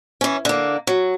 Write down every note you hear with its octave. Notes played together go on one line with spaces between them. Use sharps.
E3 C#4
D3 A#3
F#3